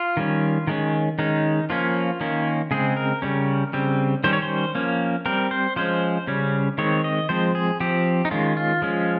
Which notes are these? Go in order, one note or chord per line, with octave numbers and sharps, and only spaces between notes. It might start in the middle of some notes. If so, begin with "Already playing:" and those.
Already playing: F4
D#3 G3 C#4
D#3 G#3 C#4
D#3 G#3 C#4 D#4
F3 A#3 C#4 F4
D#3 A#3 C#4
C#3 G#3 C4 G#4
A#4
C#3 G3 C#4
C#3 G3 C4
D#3 G3 C#4 C5
C#5
C5
F3 A#3 C#4
G3 C4 A#4
C5
F3 G#3 C#4 C5
C#3 G3 C#4
D#3 G#3 C4 C#5
D#5
F3 G#3 C4 C5
G#4
F3 C4 G4
D#4
D#3 G#3 C#4 F4
F4
F3 G#3 C#4